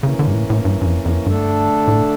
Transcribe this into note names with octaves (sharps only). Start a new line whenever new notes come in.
C#3 E3 A#3 C#4
D3
G2
A2
A2
G2
G2
F2
F2
G2 D3 A3 D4 A4
A2